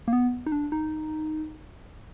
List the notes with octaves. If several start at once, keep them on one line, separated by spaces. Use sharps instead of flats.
A#3
B3
D#4
D4
D#4